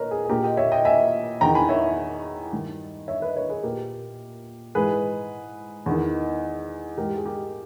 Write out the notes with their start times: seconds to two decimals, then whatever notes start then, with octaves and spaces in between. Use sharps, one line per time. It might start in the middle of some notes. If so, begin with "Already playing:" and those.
Already playing: A#2 A#4 B4 C#5 D#5
0.11 G#4
0.25 G#4
0.29 A#2 G4 A#4
0.44 D#5 G5
0.57 C#5 E5
0.72 D#5 G5
0.85 E5 G#5
1.41 E2 D#3 G5 A#5
1.55 G#5 B5
1.69 C#5 E5
2.52 G2 D#3
3.08 C#5 E5
3.22 B4 D#5
3.35 A#4 C#5
3.49 G#4 B4
3.63 A#2 G4 A#4
4.75 G#2 E3 G#4 B4
5.86 E2 D#3
6.97 G#2 E3 G4 A#4
7.17 G#4
7.25 G4 A#4